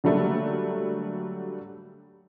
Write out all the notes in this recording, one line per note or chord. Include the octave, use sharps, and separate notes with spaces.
D3 F#3 G3 A3 A#3 D4